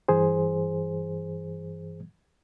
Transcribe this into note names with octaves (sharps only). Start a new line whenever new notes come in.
G2 E3 G#4 C5